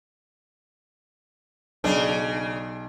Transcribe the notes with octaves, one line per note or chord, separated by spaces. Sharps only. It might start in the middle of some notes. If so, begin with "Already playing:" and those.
B1 C#3 D4